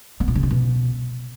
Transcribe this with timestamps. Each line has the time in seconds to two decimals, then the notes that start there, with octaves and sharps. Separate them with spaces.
0.20 B3
0.28 A#2
0.35 C#3
0.43 F3
0.51 B2